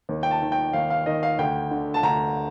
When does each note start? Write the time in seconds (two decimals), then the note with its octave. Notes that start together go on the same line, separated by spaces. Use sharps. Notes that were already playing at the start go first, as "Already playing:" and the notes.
0.09 D#2
0.23 G5
0.31 A5
0.42 D#3
0.52 G5
0.73 D#2 F5
0.90 F5
1.06 D#3 D#5
1.23 F5
1.39 D2 G5
1.71 D3
1.94 A5
2.03 D2 A#5